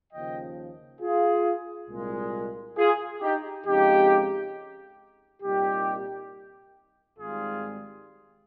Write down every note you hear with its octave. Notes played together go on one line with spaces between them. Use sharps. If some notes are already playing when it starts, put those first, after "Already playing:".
D#2 C#3 F3 D#5 G5
F4 G#4
C2 A#2 G#3
F4 G#4
D#4 G4
F2 C#3 G#3 D#4 G4
C2 A#2 G3 D#4 G4
G#1 G#2 G3 F4 G#4